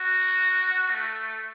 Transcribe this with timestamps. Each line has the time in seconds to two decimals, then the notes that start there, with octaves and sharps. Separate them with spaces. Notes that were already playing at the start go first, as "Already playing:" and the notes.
Already playing: F#4
0.91 A3